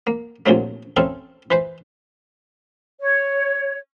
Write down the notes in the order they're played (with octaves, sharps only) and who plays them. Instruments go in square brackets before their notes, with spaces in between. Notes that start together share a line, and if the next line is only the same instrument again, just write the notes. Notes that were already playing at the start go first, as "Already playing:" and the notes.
[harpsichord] A#3
C2 A#2 D3 F3 F#3 A3
C4 C#4 E4 G#4 A4 F5
E3 B4 C5
[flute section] C#5